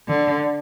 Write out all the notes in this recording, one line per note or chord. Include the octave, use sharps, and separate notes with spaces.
D3